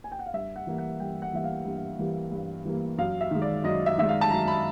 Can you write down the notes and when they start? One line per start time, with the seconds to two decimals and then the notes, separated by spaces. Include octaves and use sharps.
0.04 G#5
0.12 G5
0.19 F#5
0.26 F5
0.34 G2 E5
0.56 F#5
0.67 E3 G3 A#3
0.78 F#5
1.00 G2 G5
1.22 F#5
1.33 E3 G3 A#3 E5
1.44 F5
1.65 G2
1.99 E3 G3 A#3
2.32 G2
2.65 E3 G3 A#3
2.98 F#2 F5
3.21 E5
3.31 D#3 G#3
3.42 D5
3.64 F#2 D#5
3.86 E5
3.98 D#3 G#3 E5
4.09 F5
4.21 A5
4.30 F#2 A#5
4.48 B5